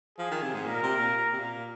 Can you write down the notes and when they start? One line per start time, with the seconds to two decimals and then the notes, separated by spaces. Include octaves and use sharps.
0.18 F3 G#4
0.31 D#3
0.43 C3
0.54 G#2
0.66 A#2 A#4
0.83 C3
0.99 A#2
1.33 C3
1.39 A#2